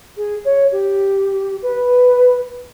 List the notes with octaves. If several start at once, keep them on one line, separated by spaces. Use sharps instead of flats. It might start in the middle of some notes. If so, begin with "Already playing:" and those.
G#4
C#5
G4
B4